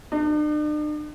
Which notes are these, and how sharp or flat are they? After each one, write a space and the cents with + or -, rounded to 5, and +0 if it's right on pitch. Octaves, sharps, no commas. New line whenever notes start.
D4 +45